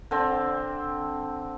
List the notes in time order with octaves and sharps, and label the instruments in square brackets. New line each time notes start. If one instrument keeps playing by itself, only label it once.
[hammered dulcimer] D3 C4